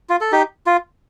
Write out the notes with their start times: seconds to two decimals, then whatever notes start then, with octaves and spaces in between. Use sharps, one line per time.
0.09 F4
0.21 A4
0.32 D#4 G4
0.66 F4